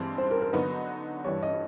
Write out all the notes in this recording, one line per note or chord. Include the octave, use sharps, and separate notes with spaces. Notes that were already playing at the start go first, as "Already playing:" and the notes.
Already playing: G2 E3 G#3 C4
C5
A#4
A#4
D3 F#3 B3 D#4 F#4 B4
G2 E3 G3 C#5
D#5